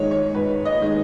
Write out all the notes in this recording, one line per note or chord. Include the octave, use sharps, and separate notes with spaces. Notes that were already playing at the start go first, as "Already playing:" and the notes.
Already playing: G#2 D#3 G#3 C#5
C#5
G#2 B4
D#5
D#3 G#3